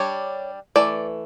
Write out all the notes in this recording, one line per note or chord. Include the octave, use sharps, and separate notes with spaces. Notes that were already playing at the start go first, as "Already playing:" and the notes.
Already playing: G3 D4 C#5
E3 A3 D5